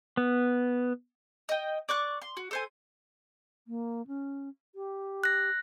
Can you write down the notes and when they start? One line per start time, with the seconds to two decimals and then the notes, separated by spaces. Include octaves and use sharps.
0.17 B3
1.49 D#5 G5
1.89 D5 C#6 F#6
2.22 C6
2.37 F#4
2.51 A4 C5 G#5
3.68 A#3
4.07 C#4
4.75 G4
5.24 F#6 A#6